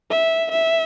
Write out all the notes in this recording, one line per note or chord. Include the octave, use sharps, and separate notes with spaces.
E5
E5